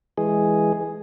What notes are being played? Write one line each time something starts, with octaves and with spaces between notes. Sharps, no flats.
E3 G#3 G#4